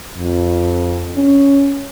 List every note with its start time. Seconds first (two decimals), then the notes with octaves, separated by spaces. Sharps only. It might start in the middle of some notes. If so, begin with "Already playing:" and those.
0.17 F2
1.16 C#4